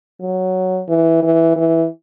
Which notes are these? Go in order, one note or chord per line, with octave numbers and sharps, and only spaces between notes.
F#3
E3
E3
E3